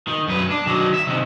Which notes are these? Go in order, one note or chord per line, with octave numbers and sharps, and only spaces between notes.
D#3
F#2 B4
D4
D#3 F#3
E5
C3 D#3